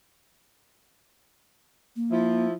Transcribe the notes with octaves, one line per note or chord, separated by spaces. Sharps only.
A#3
F3 E4